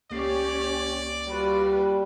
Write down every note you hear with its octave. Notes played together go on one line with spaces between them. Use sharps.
C#2 A#3 C#4 G4 C#5 D5 C7
G3 F4 F#4 B4